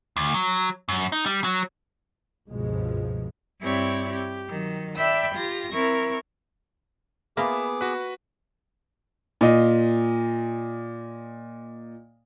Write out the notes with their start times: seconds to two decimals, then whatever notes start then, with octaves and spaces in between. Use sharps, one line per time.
0.17 D2
0.34 F#3
0.89 F#2
1.12 D#4
1.26 G3
1.44 F#3
2.48 G1 C#2 G#2 B2 F3 G#3
3.61 G2 C4 E4 G4 C#5 D5
4.09 G4
4.48 D#3 F#3
4.95 D5 E5 G5 B5 E6
5.35 F4 G4 A#6
5.72 C4 E4 A#4 C#6
7.37 A#3 B3 F4 G#4 E5 B5 D6
7.81 F#4 B4
9.41 A#2 D#5